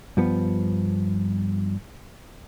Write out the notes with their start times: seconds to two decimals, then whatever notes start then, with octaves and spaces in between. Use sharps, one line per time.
0.17 G2 F3 B3